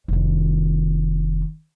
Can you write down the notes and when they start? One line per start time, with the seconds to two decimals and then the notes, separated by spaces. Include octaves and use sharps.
0.08 F1 D#3